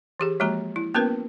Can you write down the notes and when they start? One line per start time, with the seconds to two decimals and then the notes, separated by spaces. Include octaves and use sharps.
0.20 E3 G4 G#4
0.40 F3 G#3 A#3 F#4 A#5
0.76 E4
0.94 A#3 B3 C#4 F#4 A#4 B4